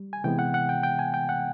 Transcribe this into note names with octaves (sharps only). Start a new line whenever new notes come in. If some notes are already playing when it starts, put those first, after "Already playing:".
Already playing: G3
G#5
C3 E3 G#3 B3 G5
F#5
F#5
G5
G5
G#5
G5
F#5